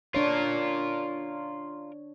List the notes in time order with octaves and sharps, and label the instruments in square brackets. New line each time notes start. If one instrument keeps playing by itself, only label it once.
[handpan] D4 C#5 [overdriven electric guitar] F4 A#4